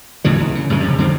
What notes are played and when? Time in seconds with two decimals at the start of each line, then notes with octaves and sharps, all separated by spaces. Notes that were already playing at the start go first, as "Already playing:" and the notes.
0.24 D#2 A2 E3 F#3
0.40 C#2
0.55 C#3
0.70 A1 F#2 C#3 E3
0.83 F2 C3
0.98 F2 D3 D#3 C4